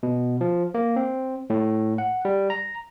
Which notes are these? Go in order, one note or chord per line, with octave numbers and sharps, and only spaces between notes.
B2
F3
A#3
C4
A2
F#5
G3
A#5